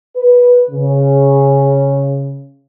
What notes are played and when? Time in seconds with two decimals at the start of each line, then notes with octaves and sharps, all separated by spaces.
0.16 B4
0.70 C#3